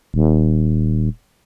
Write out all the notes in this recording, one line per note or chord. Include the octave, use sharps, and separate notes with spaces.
D#1